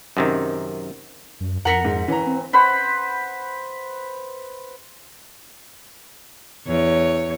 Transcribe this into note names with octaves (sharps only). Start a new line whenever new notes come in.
F#2 C3 D#3
F#2
F2 A#4 F#5 A#5 B6 C#7
G#2
E3 C#4 A#5
C4
B4 C5 F#5 B5
E2 C#5